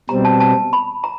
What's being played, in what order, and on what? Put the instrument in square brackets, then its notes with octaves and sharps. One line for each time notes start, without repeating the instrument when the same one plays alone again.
[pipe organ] B2 G3 C4 [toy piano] A#5
[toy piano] A5
A5
B5
A#5